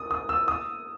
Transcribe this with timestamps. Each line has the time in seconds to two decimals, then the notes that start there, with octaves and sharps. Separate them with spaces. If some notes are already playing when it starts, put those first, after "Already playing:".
Already playing: D#6
0.11 D#6
0.29 E6
0.48 D#6